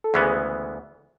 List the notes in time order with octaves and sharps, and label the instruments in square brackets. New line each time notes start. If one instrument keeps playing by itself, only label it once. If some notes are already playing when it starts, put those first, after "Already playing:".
[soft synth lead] A4
[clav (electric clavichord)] D2 C#3 E3 G#3 B3 [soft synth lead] G#4